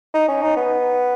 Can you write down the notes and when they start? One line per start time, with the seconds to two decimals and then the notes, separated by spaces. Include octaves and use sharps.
0.14 D#4
0.28 C#4
0.42 D#4
0.57 B3